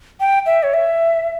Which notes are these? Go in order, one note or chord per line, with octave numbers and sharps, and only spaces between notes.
G5
E5
C#5
E5